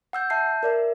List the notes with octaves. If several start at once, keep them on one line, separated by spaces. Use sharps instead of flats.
F#5 E6 G6
E5 A5 G6 C7
A#4 D5 E5